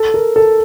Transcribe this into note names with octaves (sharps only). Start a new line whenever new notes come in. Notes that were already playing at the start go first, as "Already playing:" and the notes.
Already playing: A4
A#4
A4